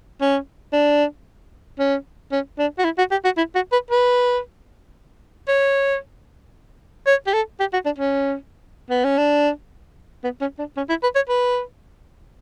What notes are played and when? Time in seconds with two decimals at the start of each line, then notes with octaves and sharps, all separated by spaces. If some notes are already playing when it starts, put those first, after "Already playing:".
0.21 C#4
0.73 D4
1.79 C#4
2.32 C#4
2.58 D4
2.78 F#4
2.84 E4
2.98 F#4
3.11 G4
3.24 F#4
3.37 E4
3.55 F#4
3.72 B4
3.90 B4
5.48 C#5
7.07 C#5
7.27 G4
7.33 A4
7.60 G4
7.73 F#4
7.85 D4
7.98 C#4
8.90 B3
9.04 C#4
9.18 D4
10.23 B3
10.41 C#4
10.58 D4
10.77 C#4
10.89 E4
11.03 B4
11.15 C#5
11.29 B4